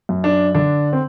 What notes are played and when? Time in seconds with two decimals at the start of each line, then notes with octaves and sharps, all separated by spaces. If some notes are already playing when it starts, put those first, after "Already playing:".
0.09 F#2
0.24 D4
0.55 D3 D4
0.93 C4